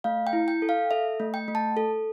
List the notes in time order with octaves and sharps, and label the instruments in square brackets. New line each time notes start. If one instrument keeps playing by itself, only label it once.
[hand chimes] A3 F5
G5
E4
G5
A4
F5
A4 E5
A3
G5
A3
A5
A4